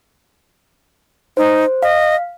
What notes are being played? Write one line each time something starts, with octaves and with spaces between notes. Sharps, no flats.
D#4 C5
D#5 F5